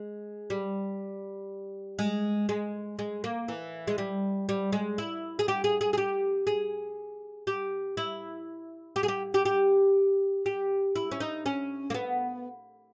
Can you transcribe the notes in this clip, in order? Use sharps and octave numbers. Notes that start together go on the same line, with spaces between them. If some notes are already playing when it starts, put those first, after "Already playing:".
Already playing: G#3
G3
G#3
G#3
G#3
A#3
E3
G#3
G3
G3
G#3
E4
G#4
G4
G#4
G#4
G#4
G4
G#4
G4
E4
G4
G#4
G4
G4
G4
G4
E4
C#4
D#4
C#4
A#3
B3